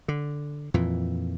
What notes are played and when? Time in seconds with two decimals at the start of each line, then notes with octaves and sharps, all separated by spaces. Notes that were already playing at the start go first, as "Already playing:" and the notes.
0.08 D3
0.74 F2 A#2 E3